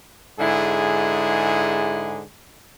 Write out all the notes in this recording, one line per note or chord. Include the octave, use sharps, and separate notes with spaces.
G#2 D3 E4 G#4